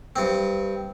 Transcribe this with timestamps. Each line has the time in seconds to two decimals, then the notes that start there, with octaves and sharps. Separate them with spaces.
0.16 G2 C4